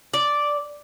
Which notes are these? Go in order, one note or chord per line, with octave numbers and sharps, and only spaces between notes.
D5